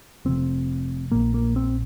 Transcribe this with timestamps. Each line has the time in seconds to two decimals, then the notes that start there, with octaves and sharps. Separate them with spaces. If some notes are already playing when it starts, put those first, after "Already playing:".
0.25 F1 F2 C3 C4
1.12 A#1 A#2 A#3
1.34 A#3
1.56 C4